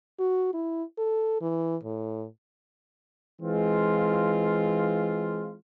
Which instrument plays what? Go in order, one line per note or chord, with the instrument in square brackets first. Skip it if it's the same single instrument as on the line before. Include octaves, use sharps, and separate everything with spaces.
[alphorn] F#4
E4
A4
E3
A2
[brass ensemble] E3 G#3 C4 F4